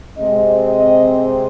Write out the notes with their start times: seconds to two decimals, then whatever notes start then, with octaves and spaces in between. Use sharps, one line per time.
0.18 C3 G#3 C4 D#5
0.69 D#5